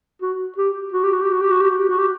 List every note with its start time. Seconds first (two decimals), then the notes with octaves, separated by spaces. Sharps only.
0.22 F#4
0.58 G4
0.93 F#4
1.03 G4
1.13 F#4
1.22 G4
1.32 F#4
1.41 G4
1.51 F#4
1.61 G4
1.70 F#4
1.79 G4
1.89 F#4
1.98 G4